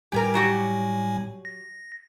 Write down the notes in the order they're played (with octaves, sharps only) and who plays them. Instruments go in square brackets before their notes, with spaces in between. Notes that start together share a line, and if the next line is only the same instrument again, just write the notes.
[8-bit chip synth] A2 G3 G#5 [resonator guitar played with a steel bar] G4 G#4 A#4
[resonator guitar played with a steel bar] F#3 F#4 G4
[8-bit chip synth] A#6